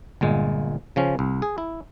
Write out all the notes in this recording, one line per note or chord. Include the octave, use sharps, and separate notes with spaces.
G1 A#2 G#3
C#3 F3 C#4
C2
G#4
E4